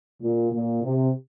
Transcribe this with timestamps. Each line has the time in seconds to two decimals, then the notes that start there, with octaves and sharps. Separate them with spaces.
0.22 A#2
0.52 A#2
0.83 C3